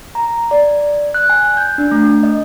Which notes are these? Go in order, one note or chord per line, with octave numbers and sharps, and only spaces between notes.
A#5
D5
F#6
G#5
G6
D4
A3
D#5